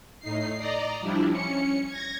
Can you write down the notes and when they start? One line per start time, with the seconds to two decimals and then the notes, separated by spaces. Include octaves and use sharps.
0.20 A2 D#4 C7
0.57 D5 D#5 A#5
1.01 F3 G3 D4 E4
1.32 C#4 C#7
1.87 G#6 A#6